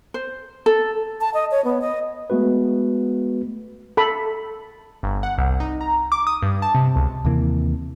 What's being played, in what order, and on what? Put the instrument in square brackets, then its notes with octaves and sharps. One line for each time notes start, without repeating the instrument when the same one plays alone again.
[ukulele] C5
A4
[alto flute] A5
D#5
C#5
B3
D#5
[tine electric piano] G#3 A3 B3 F#4 B4
[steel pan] A4 B5
[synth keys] G1
F#5
C2
D#4
A#5
D6
D#6
G2
A5
C3
C#2
[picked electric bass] D#2 C3 E3 A#3